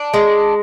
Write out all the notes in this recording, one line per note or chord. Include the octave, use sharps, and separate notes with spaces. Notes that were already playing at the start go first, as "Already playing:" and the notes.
Already playing: D4
G#3